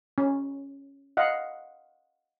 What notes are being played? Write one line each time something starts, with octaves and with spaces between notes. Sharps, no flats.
C#4
D#5 F5 F#5